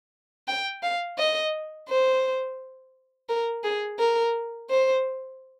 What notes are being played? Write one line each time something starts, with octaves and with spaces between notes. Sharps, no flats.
G5
F5
D#5
C5
A#4
G#4
A#4
C5